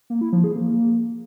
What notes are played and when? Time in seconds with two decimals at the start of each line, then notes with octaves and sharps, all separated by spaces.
0.10 A#3
0.21 E4
0.33 F3
0.44 G#4
0.55 A#3